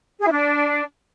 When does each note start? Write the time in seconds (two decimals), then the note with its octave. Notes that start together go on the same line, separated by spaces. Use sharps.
0.20 G#4
0.25 E4
0.31 D4